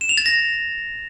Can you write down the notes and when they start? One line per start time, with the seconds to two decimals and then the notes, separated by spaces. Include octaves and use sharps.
0.01 E7
0.09 F7
0.18 A6
0.26 A#6